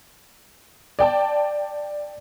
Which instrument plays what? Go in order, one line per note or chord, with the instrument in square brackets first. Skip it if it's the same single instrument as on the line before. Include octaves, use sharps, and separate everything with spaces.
[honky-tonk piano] D5 G5 A5